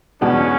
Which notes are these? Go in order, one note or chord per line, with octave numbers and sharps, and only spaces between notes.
E2 B2 G#3 B3 C#4 D4